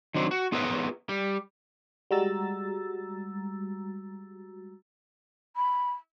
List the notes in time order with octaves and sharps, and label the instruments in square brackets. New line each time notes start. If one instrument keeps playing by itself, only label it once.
[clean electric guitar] D#3 F#3 C4 D4
F#4
B3 F4 G#4 A#4 B4 C#5
G3
[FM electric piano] G3 G#3 F#4 A#5 E6 A6
[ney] B5